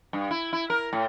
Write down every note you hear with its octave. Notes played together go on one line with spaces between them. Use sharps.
G2
E4
E4
A#4
A2